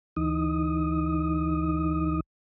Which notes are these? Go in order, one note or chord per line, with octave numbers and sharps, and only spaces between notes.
D2 E3 D#4 D#6